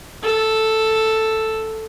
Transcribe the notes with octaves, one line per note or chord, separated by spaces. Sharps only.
A4